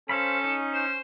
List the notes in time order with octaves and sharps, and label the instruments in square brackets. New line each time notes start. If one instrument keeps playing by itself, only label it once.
[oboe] C#4 [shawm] A4 [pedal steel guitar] C5 F5 B5
[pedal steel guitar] D#4
[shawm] C5